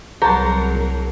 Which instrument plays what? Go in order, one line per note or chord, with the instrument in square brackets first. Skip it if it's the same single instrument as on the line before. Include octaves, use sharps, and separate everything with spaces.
[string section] C2 F#3 A#4 [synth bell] G#4 [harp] B4 A5 C6 [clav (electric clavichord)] A#5